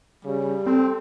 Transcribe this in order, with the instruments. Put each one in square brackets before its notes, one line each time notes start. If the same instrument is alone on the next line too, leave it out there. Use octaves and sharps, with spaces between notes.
[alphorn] C#3 [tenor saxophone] G3
[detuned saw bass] C4 [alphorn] A4